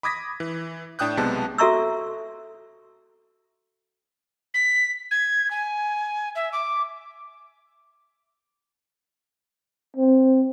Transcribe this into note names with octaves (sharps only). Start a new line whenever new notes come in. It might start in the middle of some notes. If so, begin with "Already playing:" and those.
B5 D6 D#6 G#6 A#6 B6
E3
A2 D4 G5 D#6 F#6 G6
B1 C3 G#3 B3 A5
F#4 A4 E5 A#5 C#6 E6
B6
G#6
G#5
E5
D6
C4